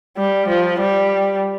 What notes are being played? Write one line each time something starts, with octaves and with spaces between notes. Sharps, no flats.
G3
F3
G3